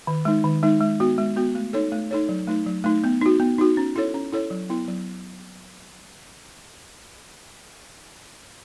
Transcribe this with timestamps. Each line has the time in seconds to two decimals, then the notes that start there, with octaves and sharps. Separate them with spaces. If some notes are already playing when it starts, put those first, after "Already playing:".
0.07 D#3
0.25 G#3 D#4
0.44 D#3
0.63 G#3 D#4
0.80 G#3
1.00 B3 F#4
1.18 G#3
1.36 B3 F#4
1.55 A3
1.73 D#4 A4 C#5
1.92 A3
2.11 D#4 A4 C#5
2.29 F#3
2.48 A3 D#4
2.66 F#3
2.84 A3 D#4
3.04 B3
3.21 D#4 F#4
3.40 B3
3.58 D#4 F#4
3.77 C#4
3.96 E4 A4 C#5
4.14 C#4
4.33 E4 A4 C#5
4.50 F#3
4.70 B3 E4
4.88 F#3